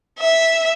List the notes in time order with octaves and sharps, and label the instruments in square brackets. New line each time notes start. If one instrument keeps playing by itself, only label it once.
[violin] E5